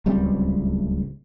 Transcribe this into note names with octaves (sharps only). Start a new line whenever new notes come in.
D1 C#2 G3 C4